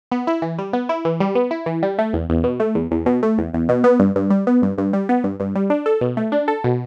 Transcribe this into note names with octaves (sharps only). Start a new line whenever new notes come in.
B3
E4
E3
G3
B3
E4
E3
G3
B3
E4
E3
G3
A3
E2
E2
B2
A3
E2
E2
B2
A3
E2
E2
B2
B3
G2
G2
G3
B3
G2
G2
G3
B3
G2
G2
G3
D4
A4
B2
A3
D4
A4
B2